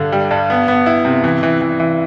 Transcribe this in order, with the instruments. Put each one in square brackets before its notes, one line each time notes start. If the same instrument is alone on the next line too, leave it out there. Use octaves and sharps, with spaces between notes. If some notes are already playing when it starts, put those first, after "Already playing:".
Already playing: [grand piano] G2 D3
G3
G2
B3
B3
E4
C3
E3
E3
E3
E3